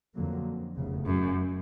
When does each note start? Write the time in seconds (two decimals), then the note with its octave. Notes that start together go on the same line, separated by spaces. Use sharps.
0.14 F2 D3 F#3 A#3
0.76 F1 E2 C#3
1.06 F#2